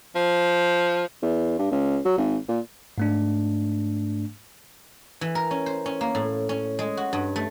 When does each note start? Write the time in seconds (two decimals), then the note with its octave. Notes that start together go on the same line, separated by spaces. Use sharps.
0.15 F3
1.22 E2
1.59 G2
1.71 C#2
2.05 F#3
2.18 G#1
2.48 A#2
2.98 G#2 A3 D4
5.21 E3
5.35 A#4
5.51 C#4
5.66 C5
5.86 C#4
6.01 A#3
6.15 A2
6.49 C#4
6.79 G#3
6.97 F#4
7.13 G2
7.36 A3